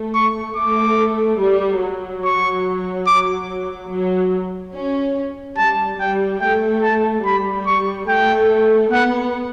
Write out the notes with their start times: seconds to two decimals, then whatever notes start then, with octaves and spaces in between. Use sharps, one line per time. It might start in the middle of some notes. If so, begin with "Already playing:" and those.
Already playing: A3
0.15 C#6
0.56 A3 D6
1.40 G3
1.81 F#3
2.24 C#6
3.07 D6
3.91 F#3
4.75 C#4
5.57 G3 A5
5.99 G3 G5
6.41 A3 G5
6.83 A5
7.25 G3 B5
7.66 C#6
8.08 A3 G5
8.91 B3 F#5